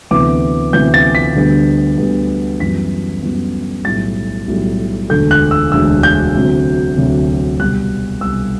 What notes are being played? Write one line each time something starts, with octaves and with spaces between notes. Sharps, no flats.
D2 C3 E3 B3 D6
D2 C3 E3 B3 G6
A6
B6
D2 D3 G3 B3
D2 D3 G3 B3
F#2 E3 G3 B3 B6
F#2 E3 G3 B3
B1 A2 G3 A6
B1 A2 G3
E1 D2 D3 A3 G6
F#6
E6
E1 D2 D3 A3 E6
G6
D2 C3 F#3
D2 C3 F#3
C2 B2 G3 F#6
C2 B2 G3 E6